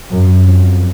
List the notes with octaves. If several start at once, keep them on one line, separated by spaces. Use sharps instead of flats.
F#2
F2